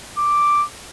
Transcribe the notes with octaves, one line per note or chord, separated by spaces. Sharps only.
D6